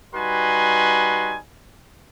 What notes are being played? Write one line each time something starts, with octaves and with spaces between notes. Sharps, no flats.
G3 D#4 F#4 B4 G#5 C6